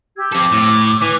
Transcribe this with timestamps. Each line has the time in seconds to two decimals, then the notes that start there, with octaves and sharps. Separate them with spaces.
0.17 G4 E6 G#6
0.32 C4 A4 D6
0.52 A2
1.02 E3